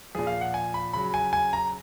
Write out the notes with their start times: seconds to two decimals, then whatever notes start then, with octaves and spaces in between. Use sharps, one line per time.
0.15 A#2 F3 G#4
0.27 F5
0.41 F#5
0.54 G#5
0.74 B5
0.93 C#3 F#3 B5
1.14 G#5
1.33 G#5
1.53 A#5